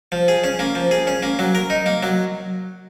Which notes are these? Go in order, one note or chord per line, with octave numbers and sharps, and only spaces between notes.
F3
G#4
C#4
A#3
F3
G#4
C#4
A#3
F#3
A#4
D#4
A#3
F#3